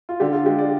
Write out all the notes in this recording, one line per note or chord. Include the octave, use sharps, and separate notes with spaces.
F4
D3 G4
F4
G#3 G4
D5